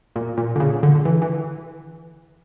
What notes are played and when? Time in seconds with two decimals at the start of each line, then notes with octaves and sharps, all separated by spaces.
0.16 A#2
0.37 A#2
0.56 D3
0.60 C#3
0.83 D3
0.95 D3
1.05 E3
1.22 E3